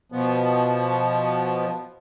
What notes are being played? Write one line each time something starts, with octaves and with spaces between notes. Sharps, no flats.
B2 F3 B3